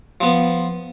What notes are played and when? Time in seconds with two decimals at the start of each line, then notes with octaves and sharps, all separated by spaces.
0.21 F3 B3